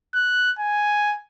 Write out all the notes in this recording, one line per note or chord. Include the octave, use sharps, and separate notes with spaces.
F#6
G#5